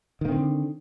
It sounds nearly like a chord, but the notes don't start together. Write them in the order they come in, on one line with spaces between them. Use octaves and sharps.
D#3 A#3 C4 D3